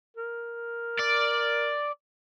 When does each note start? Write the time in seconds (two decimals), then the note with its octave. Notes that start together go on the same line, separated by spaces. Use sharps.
0.17 A#4
0.99 D5